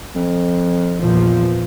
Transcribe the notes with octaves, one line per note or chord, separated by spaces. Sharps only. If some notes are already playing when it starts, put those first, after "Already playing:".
F2
E2 A#2 F3